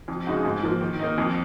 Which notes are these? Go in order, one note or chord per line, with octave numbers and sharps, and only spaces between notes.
F2
C#3 G#3 D#4 F#4
G#2
F3 A#3
D#3
A#3 D#4
F2